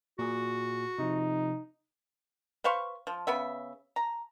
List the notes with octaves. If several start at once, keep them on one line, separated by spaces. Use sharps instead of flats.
A#2 F#4 G#4
C3 F3 D#4
B4 C5 F5 C#6
F3
C#3 B3 E5
A#5